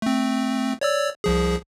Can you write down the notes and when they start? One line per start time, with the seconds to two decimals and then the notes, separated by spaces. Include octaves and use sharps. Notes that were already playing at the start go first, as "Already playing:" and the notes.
0.02 A3 C4
0.81 C#5 D5 E6
1.24 C2 F3 G#4